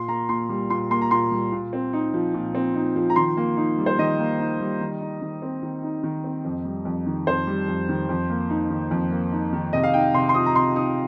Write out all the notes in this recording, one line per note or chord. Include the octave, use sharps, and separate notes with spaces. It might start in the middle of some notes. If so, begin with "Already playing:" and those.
Already playing: A#2 C6
A#3 A#5
A#2 C6
G3
A#2 C6
A#3 C6
A#5
A#2 C6
G3
A#2
C4
D#4
F3
A#2
C4
D#4
F3
A#5
D#3 C6
A#3
D#4
G3
C5
D#3 D#5
A#3
D#4
G3
D#3
D#4
D#3
C4
D#3
D#4
D#3
C4
F2
G3
F2
D#3
F2 C5
G3
F2
D#3
F2
A#3
D#4
D#3
F2
A#3
D#4
D#3
C3 D#5
F5
D#4 G5
C3 C6
C6
F3 D#6
A#5
C3 C6
D#4 D#6